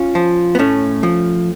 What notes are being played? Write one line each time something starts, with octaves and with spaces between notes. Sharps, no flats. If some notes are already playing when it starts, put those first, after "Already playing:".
Already playing: C#4 F4
F3
B3
A2 A3 C#4
F3